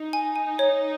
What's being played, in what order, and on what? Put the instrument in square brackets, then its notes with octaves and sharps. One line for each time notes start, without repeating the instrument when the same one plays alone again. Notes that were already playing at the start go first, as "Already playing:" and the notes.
Already playing: [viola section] D#4
[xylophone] G#5
G#5
C#5